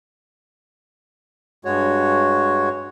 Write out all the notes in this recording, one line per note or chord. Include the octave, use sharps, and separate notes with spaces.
G2 G#3 F#4 C#5